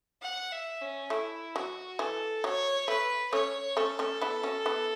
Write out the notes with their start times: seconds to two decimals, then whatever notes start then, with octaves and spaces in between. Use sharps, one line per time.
0.22 F#5
0.52 E5
0.81 C#4
1.10 A3 E4
1.56 F#3 F#4
1.99 E3 A4
2.44 F#3 C#5
2.88 A3 B4
3.32 A3 C#4 C#5
3.77 A3 C#4 A4
3.99 A3 C#4
4.21 B3 E4
4.43 C#4 F#4
4.66 B3 E4